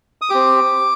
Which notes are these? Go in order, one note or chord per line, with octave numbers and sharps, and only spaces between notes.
D#6
C4 G4 D6